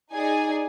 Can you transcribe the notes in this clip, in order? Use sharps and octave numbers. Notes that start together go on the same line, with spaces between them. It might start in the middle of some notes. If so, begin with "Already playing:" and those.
D#4 G#4 D5 G#5